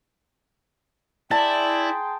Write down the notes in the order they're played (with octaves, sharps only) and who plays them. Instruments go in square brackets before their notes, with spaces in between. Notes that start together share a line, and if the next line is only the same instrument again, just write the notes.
[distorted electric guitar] E4 [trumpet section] G#4 G5 C6 [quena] D5 [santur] A5